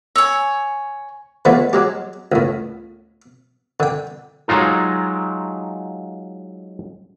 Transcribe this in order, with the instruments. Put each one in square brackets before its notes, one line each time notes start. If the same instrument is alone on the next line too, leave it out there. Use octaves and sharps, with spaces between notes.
[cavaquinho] C#5 G#5 [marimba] E6
[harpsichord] D3 F3 G#3 A3 B3
F#3 G#3 G4
C#2 A2
D3 G5
[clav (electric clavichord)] F#3 G#3 D#4 F4 A4